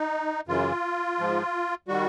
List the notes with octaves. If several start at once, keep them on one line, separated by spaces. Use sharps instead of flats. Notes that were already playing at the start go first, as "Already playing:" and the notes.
Already playing: D#4
F#2 C#3 E3 F4
G#2 F3
D#3 G3 F#4